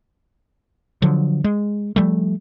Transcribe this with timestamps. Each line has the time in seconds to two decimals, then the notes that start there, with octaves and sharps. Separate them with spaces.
1.02 D3 F3 F#3
1.44 G#3
1.96 F3 G3 A3